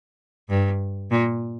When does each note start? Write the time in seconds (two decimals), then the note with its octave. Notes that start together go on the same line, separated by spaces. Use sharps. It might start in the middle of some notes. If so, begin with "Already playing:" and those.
0.49 G2
1.11 A#2